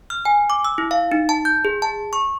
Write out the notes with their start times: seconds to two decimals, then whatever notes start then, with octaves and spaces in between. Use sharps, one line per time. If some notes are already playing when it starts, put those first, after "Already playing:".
0.10 F6
0.25 G#5
0.50 D6
0.65 E6
0.78 E4
0.91 F5
1.12 D#4
1.29 A5
1.45 G6
1.65 G#4
1.82 A5
2.13 C#6